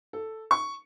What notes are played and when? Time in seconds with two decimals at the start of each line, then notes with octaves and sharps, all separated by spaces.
0.13 A4
0.51 C#6